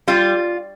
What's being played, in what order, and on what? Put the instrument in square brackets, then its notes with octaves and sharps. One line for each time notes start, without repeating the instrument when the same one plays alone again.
[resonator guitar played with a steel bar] G3 F4